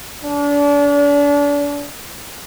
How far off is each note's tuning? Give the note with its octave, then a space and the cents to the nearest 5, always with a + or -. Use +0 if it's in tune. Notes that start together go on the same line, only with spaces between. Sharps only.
D4 -35